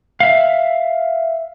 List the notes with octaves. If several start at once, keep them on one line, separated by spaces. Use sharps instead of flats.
E5 F5